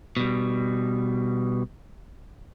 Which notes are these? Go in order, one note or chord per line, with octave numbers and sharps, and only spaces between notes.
B2 G3